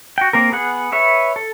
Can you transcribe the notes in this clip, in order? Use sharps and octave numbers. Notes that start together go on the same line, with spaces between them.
F#4 G5
A#3 C4 A#4
B3 G#4 F#5
B4 C#5 E5
A4